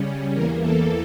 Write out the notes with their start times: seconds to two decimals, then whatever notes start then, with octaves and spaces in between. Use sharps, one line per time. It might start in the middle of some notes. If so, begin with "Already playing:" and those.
Already playing: C#3 G3 C#4
0.33 E2 E3 A#3 A#4
0.61 A4